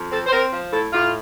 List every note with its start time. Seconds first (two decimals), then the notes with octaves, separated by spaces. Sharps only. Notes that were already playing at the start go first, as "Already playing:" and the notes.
Already playing: F2
0.12 C4 A4
0.27 C5
0.32 C4 A#4
0.52 F3
0.72 A2 A4
0.92 A2 F4